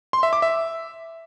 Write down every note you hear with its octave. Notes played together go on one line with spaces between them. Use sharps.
C6
E5
D6
E5